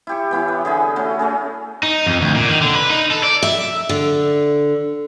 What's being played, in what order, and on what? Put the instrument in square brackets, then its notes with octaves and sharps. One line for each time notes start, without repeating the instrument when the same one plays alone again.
[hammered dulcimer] E4 G4 C#6
E3 B3 E4 C#5
B4
D3 G#4 B5
A3 C#4 F#4
A3 C#4 G#4
[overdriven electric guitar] D#4
F2
D2
A#2
D#3
D3
B4
D#4
A4
D5
[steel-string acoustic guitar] E5
D3